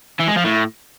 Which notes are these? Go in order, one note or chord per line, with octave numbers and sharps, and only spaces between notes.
E3
G#3
F3
A2